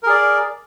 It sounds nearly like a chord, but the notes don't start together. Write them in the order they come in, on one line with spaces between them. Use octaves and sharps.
A#4 G#4 D5